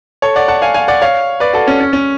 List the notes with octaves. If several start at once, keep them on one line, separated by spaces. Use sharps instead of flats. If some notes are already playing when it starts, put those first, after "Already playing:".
A4 C#5
D5 F#5
F#5 A5
F5 G#5
F5 G#5
D5 F#5
C#5 F5
B4 D5
F#4 A4
C#4
C#4
C#4